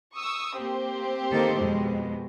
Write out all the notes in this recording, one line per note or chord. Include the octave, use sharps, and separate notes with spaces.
C#6 D#6 E6
A#3 C4 G4 C5
D#3 A#3 A4
F2 B2 G#3